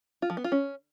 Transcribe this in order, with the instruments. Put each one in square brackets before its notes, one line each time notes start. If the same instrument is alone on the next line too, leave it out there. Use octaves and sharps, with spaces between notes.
[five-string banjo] F4
F3
B3
F4
C#4